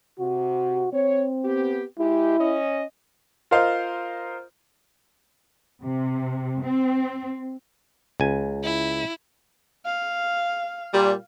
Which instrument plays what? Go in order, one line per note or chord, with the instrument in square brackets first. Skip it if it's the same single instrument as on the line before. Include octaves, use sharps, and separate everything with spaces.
[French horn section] C3 [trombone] F#4
[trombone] C4 [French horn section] C#5
[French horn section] B3 G4
[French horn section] G#3 G4 [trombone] E4
[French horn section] C#4 D#5
[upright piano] F4 A#4 C5 D#5 F5
[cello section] C3
C4
[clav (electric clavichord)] C#2 G#5
[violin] E4
[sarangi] F5
[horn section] A#2 G3